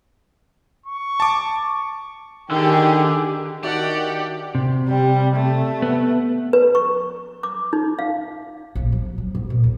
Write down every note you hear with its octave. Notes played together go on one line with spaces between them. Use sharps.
C#6
A5 D6
D3 D#3 G4 G#4
D#3 D4 F#4 G4 D5 E5 F#5
C3
G3
A3
B3
B4
C#6
D6
D#4
F5
A#1
F3
F#3
G#2
A#2
D#2